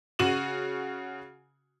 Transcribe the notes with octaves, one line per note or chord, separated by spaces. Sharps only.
C#3 F#4 D#7 E7 F#7